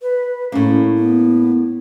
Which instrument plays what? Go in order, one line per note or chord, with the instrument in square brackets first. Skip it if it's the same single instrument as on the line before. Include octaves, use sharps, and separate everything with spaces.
[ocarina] B4
[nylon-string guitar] A2 A#3 [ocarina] C#4
[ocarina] B3